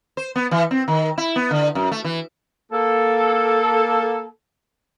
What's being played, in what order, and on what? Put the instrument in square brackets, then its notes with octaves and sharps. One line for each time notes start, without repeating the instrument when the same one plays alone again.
[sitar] C5
B3
E3
C4
D#3
E4
B3
D3
F#2
A3
E3
[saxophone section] A#3 A4